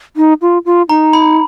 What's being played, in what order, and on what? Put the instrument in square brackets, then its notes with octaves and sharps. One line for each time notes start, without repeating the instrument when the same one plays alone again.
[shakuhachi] D#4
F4
F4
[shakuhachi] D#4 [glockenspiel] A#5
[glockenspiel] B5